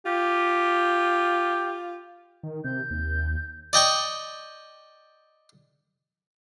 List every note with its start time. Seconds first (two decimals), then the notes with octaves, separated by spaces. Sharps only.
0.06 F4 G4
2.43 D#3
2.64 C3 G6
2.91 D#2
3.73 D5 D#5 G5 C#6